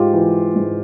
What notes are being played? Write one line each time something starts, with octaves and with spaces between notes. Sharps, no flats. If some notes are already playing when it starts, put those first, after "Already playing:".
Already playing: G#2 F4 G4
E3
G#2